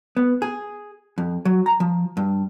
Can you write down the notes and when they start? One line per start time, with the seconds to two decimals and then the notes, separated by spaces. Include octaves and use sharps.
0.17 B3
0.42 G#4
1.18 F2
1.45 F#3
1.66 A#5
1.80 F3
2.17 G2